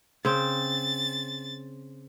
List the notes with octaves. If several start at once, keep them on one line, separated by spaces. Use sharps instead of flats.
C#3 C4 A6